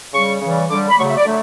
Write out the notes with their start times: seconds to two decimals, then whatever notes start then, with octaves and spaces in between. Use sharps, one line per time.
0.14 C#3 G3 C#6
0.41 C#3 E3 G3
0.69 D3 G3 D6
0.89 B5
0.98 C#3 F#3 A3 C#6
1.08 E5
1.16 D5
1.26 D3 F#3 A3